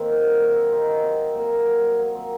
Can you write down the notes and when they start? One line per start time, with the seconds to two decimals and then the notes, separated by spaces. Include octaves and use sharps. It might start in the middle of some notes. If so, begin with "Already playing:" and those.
Already playing: D#3 A#3 C4
0.09 F#3
0.25 A#2
0.40 A#2 A#3
0.56 F#3 C4
0.72 C3 C4 D#4
0.88 F#3
1.03 C3 C4
1.19 C3
1.35 A#2 A#3
1.51 F#3
1.67 F#3
1.83 F#3
1.98 F#3 A#3
2.15 F#3 C4